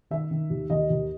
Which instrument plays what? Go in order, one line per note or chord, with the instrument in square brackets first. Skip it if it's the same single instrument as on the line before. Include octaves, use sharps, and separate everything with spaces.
[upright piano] D#3 E5
D#3
D#2
D#2 D#5
D#2